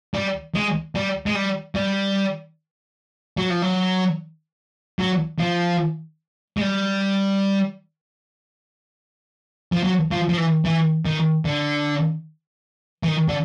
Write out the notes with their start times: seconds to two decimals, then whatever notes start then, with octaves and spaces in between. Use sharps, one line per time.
0.14 G3
0.55 G#3
0.95 G3
1.26 G#3
1.35 G3
1.75 G3
3.37 F#3
3.50 F3
3.62 F#3
4.99 F#3
5.39 F3
6.57 G#3
6.61 G3
9.72 F3
9.84 F#3
10.11 F3
10.29 F3
10.37 E3
10.65 E3
11.06 D#3
11.45 D3
13.03 E3
13.07 D#3
13.28 D3